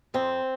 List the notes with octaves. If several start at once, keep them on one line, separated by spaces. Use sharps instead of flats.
F2 C4